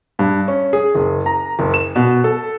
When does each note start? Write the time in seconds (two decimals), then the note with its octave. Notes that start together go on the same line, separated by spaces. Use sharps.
0.19 G2
0.48 C#4
0.73 G#4
0.95 F#1
1.26 A#5
1.59 F#1
1.74 E7
1.96 B2
2.24 A4